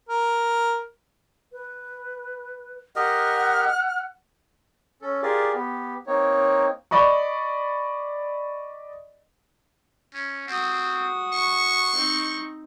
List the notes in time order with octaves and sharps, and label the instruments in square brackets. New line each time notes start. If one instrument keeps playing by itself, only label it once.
[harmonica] A#4
[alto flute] B4
[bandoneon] G4 A#4 [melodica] D#5 [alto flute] F#5 [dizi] F6
[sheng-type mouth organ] C#4 A4
F4 G4 G#4 A#4 D5
B3 G4
A#3 C4 D#4 C#5
[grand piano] D5 D#5 B5 C#6
[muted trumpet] C#4
[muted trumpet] C4 [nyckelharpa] F#4 D#6
[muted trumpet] C#6
[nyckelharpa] C4 D#4